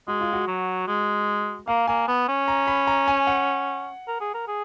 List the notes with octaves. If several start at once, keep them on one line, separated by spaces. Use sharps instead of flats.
G#3 F#4
F4
F#4
F#3
G#3
A#3 F5
A#3 G#5
B3
C#4
A#5
B5
A#5
G#5
F#5
A#4
G#4
A#4
G#4